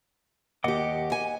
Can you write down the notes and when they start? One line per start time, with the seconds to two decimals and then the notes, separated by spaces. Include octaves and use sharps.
0.64 D#2 G4 D#5 F#5 D6
1.12 G#5